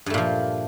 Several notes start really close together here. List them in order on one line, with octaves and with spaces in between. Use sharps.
G2 A3 A#2 F3